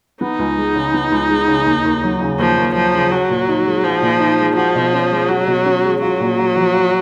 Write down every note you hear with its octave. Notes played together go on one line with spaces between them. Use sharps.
B3 D#4
C#2
G#3
C#3
B3
C#2
G#3
C#3
D#2
D#2
F#3
C#3
D#2 F3
D#2
F3 F#3
C#3
F#3 F#4
A#2
D#4
G#3
F3 F#4
A#2
D#4
G#3
F3 F#4
B2
C#4
G#3
F#3 F#4
B2
C#4
G#3
F#3 F4
A#2
A#3
F3
F4